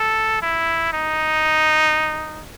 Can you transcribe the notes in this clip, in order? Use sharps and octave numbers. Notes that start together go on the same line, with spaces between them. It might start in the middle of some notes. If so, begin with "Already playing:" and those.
Already playing: A4
E4
D#4